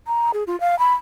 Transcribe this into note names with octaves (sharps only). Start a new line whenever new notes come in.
A#5
G#4
F4
F5
B5